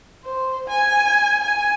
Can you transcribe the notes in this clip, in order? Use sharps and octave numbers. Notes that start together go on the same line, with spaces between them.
C5
G#5
G#5